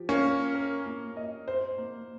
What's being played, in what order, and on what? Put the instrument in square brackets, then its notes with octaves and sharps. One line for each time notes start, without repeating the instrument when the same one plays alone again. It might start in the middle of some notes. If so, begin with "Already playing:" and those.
Already playing: [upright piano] F3 G4
[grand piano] A#3 C#4
[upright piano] C#5
A#4
A#3
D#5
C5
A#3